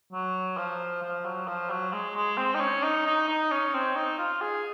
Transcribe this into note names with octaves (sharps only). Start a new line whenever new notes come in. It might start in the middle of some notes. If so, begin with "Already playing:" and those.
F#3
F3
F3
F#3
F3
F#3
G#3
G#3
C4
D#4
C#4
D#4
D#4
D#4
C#4
C4
D#4
F4
G#4